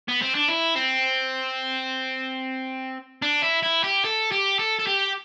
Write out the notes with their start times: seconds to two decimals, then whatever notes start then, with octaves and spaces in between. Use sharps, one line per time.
0.09 B3
0.22 C4
0.35 D4
0.48 E4
0.76 C4
3.22 D4
3.42 E4
3.63 E4
3.84 G4
4.05 A4
4.32 G4
4.59 A4
4.80 A4
4.87 G4